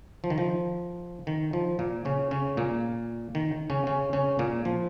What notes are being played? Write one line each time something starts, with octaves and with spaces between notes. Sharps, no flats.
F3
D#3
F3
D#3
F3
A#2 A#3
C#3 C#4
C#3 C#4
A#2 A#3
D#3
C#3 C#4
C#3 C#4
C#3 C#4
A#2 A#3
F3